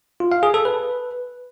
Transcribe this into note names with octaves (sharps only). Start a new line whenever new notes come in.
F4
F5
G#4
A4
B4